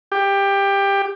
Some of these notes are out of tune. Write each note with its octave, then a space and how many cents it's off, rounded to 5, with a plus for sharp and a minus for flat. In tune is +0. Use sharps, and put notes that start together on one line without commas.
G4 +15